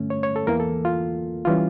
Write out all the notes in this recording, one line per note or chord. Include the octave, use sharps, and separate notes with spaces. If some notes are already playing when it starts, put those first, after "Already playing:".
Already playing: G2 D3 A3 C#4
C#5
C#5
A4
E2 E3 A#3 A#4
A4
F4
E3 G3 C#4 F4